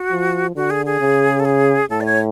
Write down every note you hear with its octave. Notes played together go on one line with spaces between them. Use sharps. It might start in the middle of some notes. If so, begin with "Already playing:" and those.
Already playing: F#4
F3
D3 F#4
G#4
G#4
C#3
A4
G#4
A2 A4
D5
C#5